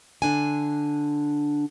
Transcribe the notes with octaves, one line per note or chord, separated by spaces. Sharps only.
D3 D4 G#5